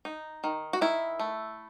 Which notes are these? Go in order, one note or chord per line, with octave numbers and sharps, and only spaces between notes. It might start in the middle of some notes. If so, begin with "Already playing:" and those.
D#4
D#3
F#4
D#3 E4
A3